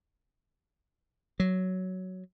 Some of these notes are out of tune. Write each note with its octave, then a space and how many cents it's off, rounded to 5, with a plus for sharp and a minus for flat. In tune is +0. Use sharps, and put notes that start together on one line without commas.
F#3 +5